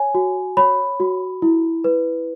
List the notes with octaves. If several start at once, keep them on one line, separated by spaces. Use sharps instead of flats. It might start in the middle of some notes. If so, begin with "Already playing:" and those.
Already playing: C#5 G#5
F#4
C#5 B5
F#4
E4
B4